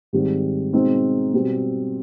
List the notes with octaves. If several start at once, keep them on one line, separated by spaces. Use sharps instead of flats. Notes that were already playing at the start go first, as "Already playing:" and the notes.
G#2 D#3 G3 C4
B2 G#3 C4 D#4
B2 G3 C4